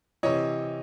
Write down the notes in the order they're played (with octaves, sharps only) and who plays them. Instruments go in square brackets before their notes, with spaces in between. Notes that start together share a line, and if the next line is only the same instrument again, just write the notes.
[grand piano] C3 E3 C#5 D#5